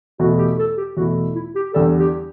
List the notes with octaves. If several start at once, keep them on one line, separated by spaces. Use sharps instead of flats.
E2 B2 A3 E4 F#4
G4
A4
G4
E2 B2 A3 E4 F#4
E4
G4
E2 D3 G3 A4
G4